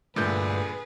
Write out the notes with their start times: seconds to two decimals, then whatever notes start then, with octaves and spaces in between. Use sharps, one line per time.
0.16 G2 A#2 D3 A3 G#4 B4 G6